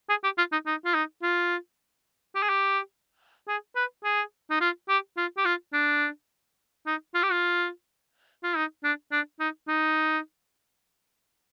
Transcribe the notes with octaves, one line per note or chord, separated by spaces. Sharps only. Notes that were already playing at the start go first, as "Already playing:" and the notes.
G#4
G4
F4
D#4
D#4
F4
D#4
F4
G4
G#4
G4
G#4
B4
G#4
D#4
F4
G4
F4
G4
F4
D4
D#4
F4
G4
F4
F4
D#4
D4
D4
D#4
D#4